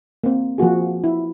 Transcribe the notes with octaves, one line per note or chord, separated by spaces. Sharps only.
A#3 C4
F3 A#3 F#4 G#4
E4